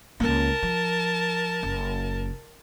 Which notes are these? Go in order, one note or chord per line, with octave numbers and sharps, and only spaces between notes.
C#2 A#3 A#4 A5
F3
F#1